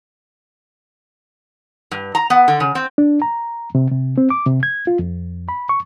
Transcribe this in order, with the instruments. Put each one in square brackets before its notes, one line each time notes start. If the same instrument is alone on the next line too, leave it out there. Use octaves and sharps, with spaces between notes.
[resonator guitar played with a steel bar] G2
A#5
B3
D3
C#3
C4
[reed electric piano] D4
A#5
C3
C3
C4
D6
C3
G#6
F4
F2
B5
C#6